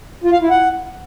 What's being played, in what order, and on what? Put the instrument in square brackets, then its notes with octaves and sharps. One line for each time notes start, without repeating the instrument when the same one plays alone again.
[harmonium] F4
F5
E4
F#5